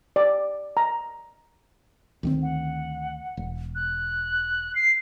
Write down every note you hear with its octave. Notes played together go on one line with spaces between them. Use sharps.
D5
A#5
D2 D#3 C4
F#5
E1
F#6
C7